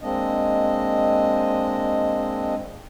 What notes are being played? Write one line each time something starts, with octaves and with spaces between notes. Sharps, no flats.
G#3 A#3 C4 D4 D#5